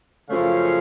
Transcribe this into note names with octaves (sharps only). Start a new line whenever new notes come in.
F#2 C#3 F3 A3 C#4 F5